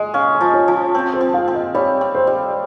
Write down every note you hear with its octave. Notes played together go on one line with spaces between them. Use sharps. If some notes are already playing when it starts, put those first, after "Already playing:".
Already playing: G#3 D#5
C#4 F5
D#5
F3
C#5
F3
C4
C5
C4
F5
C4
D#5
G3 C#5
C4
C5
G3